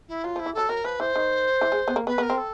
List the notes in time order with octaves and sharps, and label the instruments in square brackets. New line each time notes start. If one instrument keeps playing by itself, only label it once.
[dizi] E4
[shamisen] F#3 [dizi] F4
[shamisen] F3
[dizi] E4
[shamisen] E3
[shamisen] F#3 [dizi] A4
[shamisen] F#3 [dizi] A#4
[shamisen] F3 [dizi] B4
[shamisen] E3 [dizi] C5
[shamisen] D#3
E3
G#3
B3
A#3
[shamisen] B3 [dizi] B4
[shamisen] B3
[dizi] A#4
[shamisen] C4
[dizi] A4